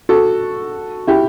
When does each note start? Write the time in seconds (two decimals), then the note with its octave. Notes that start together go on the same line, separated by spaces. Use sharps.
0.09 F#4 A4
1.07 E4 G4